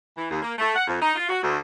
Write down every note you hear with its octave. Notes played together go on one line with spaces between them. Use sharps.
E3
D#2
A#3
A3
F#5
F2
D#4
F4
F#4
D2